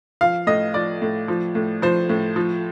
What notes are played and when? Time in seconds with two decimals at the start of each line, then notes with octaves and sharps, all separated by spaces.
0.21 F3 F5
0.47 A2 D#5
0.74 F3 D5
1.02 A2
1.28 F3
1.55 A2
1.82 F3 C5
2.09 A2
2.36 F3